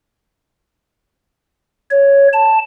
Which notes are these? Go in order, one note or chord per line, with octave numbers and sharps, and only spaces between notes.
C#5
A5